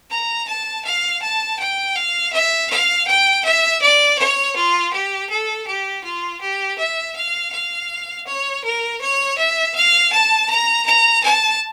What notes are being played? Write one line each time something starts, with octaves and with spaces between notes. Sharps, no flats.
A#5
A5
F5
A5
G5
F5
E5
F5
G5
E5
D5
C#5
F4
G4
A4
G4
F4
G4
E5
F5
F5
C#5
A#4
C#5
E5
F5
A5
A#5
A#5
A5